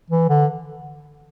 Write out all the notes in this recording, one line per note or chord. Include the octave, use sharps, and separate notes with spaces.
E3
D3